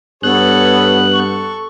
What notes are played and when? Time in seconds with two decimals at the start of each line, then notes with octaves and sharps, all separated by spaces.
0.23 G2 B3 A4 C#5 F#6
1.14 A4 C#6